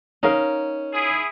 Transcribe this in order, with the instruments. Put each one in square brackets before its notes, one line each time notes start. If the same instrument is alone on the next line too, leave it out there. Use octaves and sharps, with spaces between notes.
[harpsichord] C#4 [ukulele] D#4 A#4 F5
[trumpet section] E4 G#4